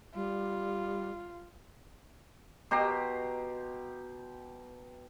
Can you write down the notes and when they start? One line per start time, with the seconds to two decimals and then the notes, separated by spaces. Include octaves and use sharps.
0.15 G3 F4
2.71 B2 G4 A#5 C6